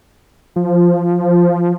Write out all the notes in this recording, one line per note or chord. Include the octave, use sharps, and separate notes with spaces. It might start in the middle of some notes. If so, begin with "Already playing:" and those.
F3